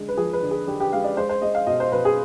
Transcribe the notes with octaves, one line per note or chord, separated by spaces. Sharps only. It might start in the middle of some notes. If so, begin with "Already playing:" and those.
Already playing: D3 G#3
B4
F3 G#4
B4
D3
G#4
D3 G4
G4
G#3 F5
D5
G#3 C5
C5
G#3 D#5
F5
B2 D#5
C5
B2 B4
G#4